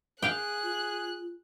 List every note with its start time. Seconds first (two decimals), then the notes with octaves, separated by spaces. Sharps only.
0.22 G#4 F5 G5 F#6
0.63 F4